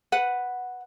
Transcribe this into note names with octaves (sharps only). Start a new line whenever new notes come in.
B4 F#5